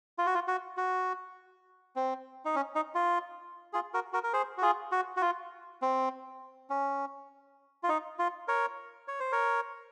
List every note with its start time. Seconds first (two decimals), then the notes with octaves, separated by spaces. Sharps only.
0.18 F4
0.26 F#4
0.35 F4
0.48 F#4
0.77 F#4
1.96 C4
2.45 D#4
2.55 C#4
2.75 D#4
2.95 F4
3.73 F4 G#4
3.94 F#4 A#4
4.13 F#4 A#4
4.23 A#4
4.33 G#4 C5
4.58 F#4
4.62 F4 G#4
4.92 F#4
5.17 F#4
5.22 F4
5.82 C4
6.70 C#4
7.83 F4
7.89 D#4
8.19 F4
8.48 A#4 C#5
9.08 C#5
9.20 C5
9.32 A#4 C#5